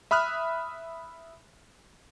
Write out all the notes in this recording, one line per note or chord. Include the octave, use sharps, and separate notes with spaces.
E5 B5 D#6 F6 F#6